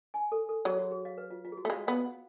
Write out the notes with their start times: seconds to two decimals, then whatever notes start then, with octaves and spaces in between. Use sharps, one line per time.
0.14 G#5
0.32 A4
0.49 A4
0.65 F#3 G#4
0.79 F#4
0.91 G#4
1.05 F5
1.18 B4
1.30 F4
1.45 F4
1.52 G#4
1.57 F#4
1.65 A3
1.70 G#3 F5
1.87 B3 F5
2.05 F#5